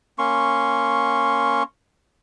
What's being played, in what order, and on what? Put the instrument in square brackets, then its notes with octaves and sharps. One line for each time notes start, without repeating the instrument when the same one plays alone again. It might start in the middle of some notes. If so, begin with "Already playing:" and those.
[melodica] A#3 C#4 C6 C#6